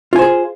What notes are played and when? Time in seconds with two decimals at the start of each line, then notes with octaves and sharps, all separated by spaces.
0.13 F4
0.16 G#5
0.19 C5
0.22 G#4